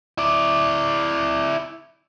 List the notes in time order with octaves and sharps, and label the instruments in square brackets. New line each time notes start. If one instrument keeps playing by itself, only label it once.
[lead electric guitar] E4 D5